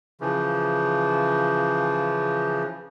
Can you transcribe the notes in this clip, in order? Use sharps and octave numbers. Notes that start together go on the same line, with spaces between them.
C#3 E3 F3